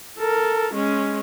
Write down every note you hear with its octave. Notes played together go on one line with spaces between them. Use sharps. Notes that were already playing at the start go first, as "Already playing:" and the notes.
A4 A#4
G#3 C#4